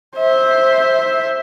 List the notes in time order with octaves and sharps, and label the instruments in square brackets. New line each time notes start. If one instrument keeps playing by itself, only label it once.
[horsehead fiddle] C5 E5